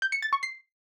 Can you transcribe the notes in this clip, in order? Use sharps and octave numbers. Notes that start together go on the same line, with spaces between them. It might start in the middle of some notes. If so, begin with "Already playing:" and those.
G6
C#7
A6
C#6
C7